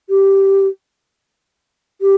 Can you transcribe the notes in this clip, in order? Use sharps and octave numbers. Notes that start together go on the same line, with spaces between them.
G4
G4